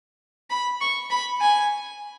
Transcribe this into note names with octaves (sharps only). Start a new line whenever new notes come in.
B5
C#6
B5
G#5